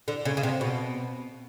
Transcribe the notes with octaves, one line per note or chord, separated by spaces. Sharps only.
D3
C#3
C#3
C3
B2